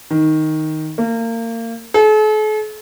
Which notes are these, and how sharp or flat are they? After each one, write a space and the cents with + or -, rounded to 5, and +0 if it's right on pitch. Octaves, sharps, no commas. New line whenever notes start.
D#3 +5
A#3 -30
A4 -45